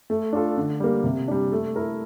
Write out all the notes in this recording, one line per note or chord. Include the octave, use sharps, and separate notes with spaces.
A3
D4 F4 A4
D3
G3 A#3
C3
G3 D4
A3
E4 A#4